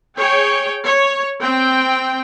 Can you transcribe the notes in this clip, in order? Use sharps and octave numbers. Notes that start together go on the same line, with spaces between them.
G#4 C#5 G5
C#5
C4 G5